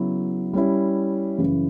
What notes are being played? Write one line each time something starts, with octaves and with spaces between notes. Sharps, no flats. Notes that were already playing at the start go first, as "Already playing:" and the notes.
Already playing: C#3 F#3 B3 E4
G3 C#4 E4
F#2 C#3 E3